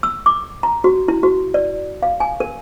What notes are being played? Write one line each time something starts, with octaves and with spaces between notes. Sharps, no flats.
E6
D6
A#5
F#4
E4
F#4
D5
F5
G#5
A#4